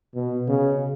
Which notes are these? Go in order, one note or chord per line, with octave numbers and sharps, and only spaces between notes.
B2
C#3